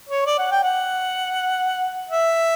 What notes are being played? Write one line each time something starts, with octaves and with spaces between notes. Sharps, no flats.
C#5
D5
F#5
G5
F#5
E5